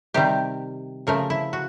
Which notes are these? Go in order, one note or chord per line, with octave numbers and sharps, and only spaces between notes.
C3 D#3 G3 G4
C#3 F3 A3 A#4
E4
F#4